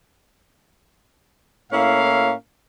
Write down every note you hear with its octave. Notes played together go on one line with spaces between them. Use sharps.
A2 A#3 C#4 E4 F5